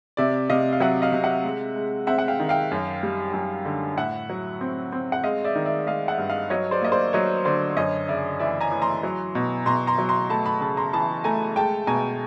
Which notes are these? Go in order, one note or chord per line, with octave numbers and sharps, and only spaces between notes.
C3 D5 E5
C3 D#5 F5
F5
F#3 E5 F#5
D#5 F5
C3
E5 F#5
G#3
G#3
C4 E5 F#5
F#5
F5 G5
D#3
F5 G5
F#2
G3
F#2
D3
A2 E5 F#5
F#3
C4
C4
F#5
G#3 D#5 F5
D5 E5
D#3
D5 E5
G#3 D#5 F5
E5 F#5
G2
D#5 F5
F#3 C#5 D#5
C5 D5
A#3 D#5
C5 D5
F#3 C#5 D#5
D3 C5 D5
F#2 C#5 D#5
C#3 D5 E5
E3 D5 E5
G#5 A#5
E3
A#5 C6
F#3
B2
B2 A#5 C6
A#5 C6
F#3
A#5 C6
A3 A5 B5
A5 B5
C#3 A5 B5
A#5 C6
E3 A5 B5
A3 G#5 A#5
G#3 G5 A5
B2 G#5 A#5